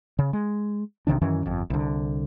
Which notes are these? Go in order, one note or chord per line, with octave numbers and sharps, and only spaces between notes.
C#3
G#3
B1 C3 D#3 D4
F#2 D#3 E3 C#4
G1 F2
C2 D3